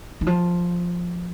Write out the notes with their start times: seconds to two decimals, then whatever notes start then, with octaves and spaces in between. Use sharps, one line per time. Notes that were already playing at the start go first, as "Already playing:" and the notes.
0.21 D#3
0.27 F3